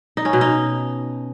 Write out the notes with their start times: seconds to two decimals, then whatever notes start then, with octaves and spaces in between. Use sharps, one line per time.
0.17 D#4
0.25 C#4
0.33 B2
0.41 D#4